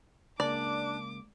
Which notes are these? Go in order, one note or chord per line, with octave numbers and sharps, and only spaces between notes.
C#2 A#3 D4 D5 D6